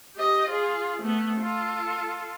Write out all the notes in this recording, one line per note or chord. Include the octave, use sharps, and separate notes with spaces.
G4 D#5
F4 G#4
A3 B3
F4 A4